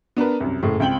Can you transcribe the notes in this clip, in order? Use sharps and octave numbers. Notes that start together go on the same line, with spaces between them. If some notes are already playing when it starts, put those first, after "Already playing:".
B3 D4 A#4 B4
C2 F#2
F#1 A2 G#4
C#2 C4 G5 F#7